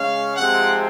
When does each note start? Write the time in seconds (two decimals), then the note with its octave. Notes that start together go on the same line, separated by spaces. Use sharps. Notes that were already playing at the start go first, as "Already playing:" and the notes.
Already playing: C#3 G#3 C#4 F5
0.36 C3 F3 G#3 C4 F#5